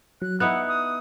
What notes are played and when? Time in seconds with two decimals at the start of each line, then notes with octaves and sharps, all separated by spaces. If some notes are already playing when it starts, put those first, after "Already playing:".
0.22 F#3 F#6
0.40 B3 D#4 E4 F#5 F#6
0.68 D#6